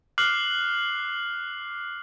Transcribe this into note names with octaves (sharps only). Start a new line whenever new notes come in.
D6 F6 F#6 C7 F#7